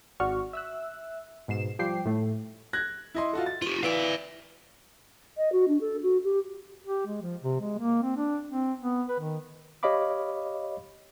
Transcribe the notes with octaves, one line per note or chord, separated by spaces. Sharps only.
G#1 F#4 D5 C#6 F6
E5 E6 F#6
G#2 B2 C7 E7
F3 G3 G5 D6 C7
A2 A3
F#6 G#6 A#6
E4 D#5 C6
F4 F#4 A4
A6
F4 G4 D5
E3 D5 E5 F5 D6
D#5
F#4
D4
A4
F#4
G4
G4
G#3
F3
C3
G#3
A#3
C4
D4
C4
B3
B4
D#3
G4 C#5 D#5 F5 B5 D6